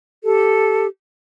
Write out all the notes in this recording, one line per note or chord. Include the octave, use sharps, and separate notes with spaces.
G4 A4